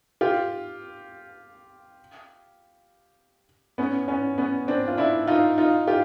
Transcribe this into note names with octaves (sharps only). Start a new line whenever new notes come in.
F4 G4
B3 C#4
B3 C#4
B3 C#4
C4 D4
F4
D4 E4
D#4 F4
D#4 F4
F4 G4